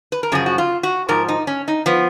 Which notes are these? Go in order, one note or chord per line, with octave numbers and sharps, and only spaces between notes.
B4
A#4
F#2 C#3 F3 G#4
F#4
F4
F#4
G#2 F3 A#4
D#4
C#4
D#4
F3 B3